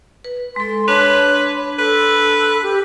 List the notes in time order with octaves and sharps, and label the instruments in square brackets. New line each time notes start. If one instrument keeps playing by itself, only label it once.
[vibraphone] B4
[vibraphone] G#3 A4 [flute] C6
[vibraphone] D4 A5 C6 [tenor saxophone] B4 [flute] C#5
[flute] A4 [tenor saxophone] B4
[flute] G4